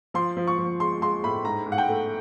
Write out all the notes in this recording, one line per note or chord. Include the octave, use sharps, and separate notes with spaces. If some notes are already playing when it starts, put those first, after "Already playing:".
F3 C6
F3
C#6
F3
G#3 C6
G#3 C6
A2 B5
G#2 A#5
G#2
F#5
G5
A3